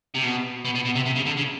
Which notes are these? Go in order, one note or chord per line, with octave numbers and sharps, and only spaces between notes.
C3
B2
B2
B2
B2
C3
C3
C#3
D3
C#3